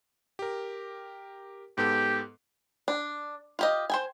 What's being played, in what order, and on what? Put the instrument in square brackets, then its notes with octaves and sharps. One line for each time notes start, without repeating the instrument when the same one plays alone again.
[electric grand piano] G4 A#4
[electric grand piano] G#2 B3 A4 [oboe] G4
[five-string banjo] D4
F4 G4 D#5
C5 G5 G#5